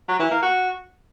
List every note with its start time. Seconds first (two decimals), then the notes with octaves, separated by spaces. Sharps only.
0.08 F#3
0.19 E3
0.31 A#3
0.42 F#4